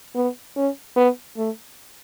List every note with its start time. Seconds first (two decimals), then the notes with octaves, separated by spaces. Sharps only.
0.16 B3
0.56 C#4
0.96 B3
1.37 A3